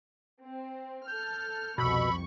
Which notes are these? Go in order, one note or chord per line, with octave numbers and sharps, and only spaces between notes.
C4
A4 F6 G6
C2 F2 B2 B5 C#6 E6